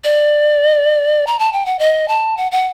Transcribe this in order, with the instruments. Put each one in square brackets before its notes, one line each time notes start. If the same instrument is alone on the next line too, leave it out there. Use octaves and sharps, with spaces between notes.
[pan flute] D5
A#5
A5
G5
F#5
D#5
A5
F#5
F#5